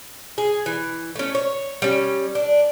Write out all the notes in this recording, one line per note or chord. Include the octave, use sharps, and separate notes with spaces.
G#4
E3
A3 C#4
C#5
G3 C#4
D4